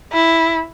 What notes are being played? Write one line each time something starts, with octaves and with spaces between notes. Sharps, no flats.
E4